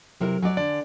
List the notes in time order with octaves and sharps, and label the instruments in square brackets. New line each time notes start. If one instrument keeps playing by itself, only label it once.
[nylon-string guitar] C3 E4 A#4 [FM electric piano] F#3
[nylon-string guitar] F#3 D5 [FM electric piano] G#5
[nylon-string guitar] D3 [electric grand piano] D5